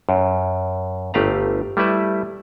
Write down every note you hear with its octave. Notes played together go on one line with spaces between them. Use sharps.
F#2
G1 A3 G4 B4 F5 A#5
G3 A3 E4 B4 E5